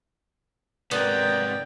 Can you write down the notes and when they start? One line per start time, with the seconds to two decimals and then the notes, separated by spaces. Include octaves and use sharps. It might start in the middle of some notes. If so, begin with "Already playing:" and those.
0.91 G#2 C3 B3 A#4 D5 G5